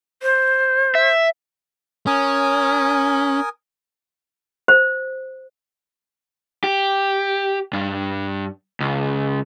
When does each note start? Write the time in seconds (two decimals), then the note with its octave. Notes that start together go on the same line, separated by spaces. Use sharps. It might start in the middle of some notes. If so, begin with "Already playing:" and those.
0.22 C5
0.95 E5
2.07 C#4 A#4 G#5 D#6
4.68 C5
6.64 G4
7.73 G2
8.80 C#2